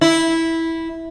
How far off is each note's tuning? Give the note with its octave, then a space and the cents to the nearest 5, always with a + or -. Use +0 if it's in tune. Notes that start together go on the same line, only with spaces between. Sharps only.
E4 -10